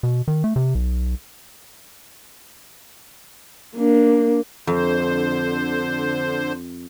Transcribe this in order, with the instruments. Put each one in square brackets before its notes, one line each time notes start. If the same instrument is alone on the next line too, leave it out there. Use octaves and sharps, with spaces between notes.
[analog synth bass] B2
D#3
A3
C3
B1
[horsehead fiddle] A#3 D4
[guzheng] F2 [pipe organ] D3 C5